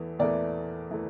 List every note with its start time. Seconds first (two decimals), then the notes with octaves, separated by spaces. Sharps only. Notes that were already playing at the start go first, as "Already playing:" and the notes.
Already playing: E2 E3 A3
0.19 E2 E3 A3 A#4 D5
0.91 E3 A3